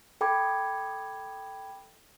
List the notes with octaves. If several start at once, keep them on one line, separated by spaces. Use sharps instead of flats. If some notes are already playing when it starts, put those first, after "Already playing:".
A4 G5 B5 D6 G#6